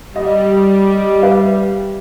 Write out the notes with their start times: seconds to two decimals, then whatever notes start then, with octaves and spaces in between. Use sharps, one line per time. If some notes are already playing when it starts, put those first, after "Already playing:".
0.16 G3 D#5
1.22 B4 E5 F5